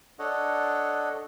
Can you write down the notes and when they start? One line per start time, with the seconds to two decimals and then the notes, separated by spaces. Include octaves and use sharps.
0.19 D4 A4 C#5 D#5 F#5